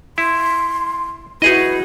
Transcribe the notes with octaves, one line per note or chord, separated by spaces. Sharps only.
E4 C6
D#4 E4 F#4 G#4 B4 D#5